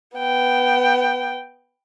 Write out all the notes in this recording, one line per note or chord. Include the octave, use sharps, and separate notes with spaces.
B3 G5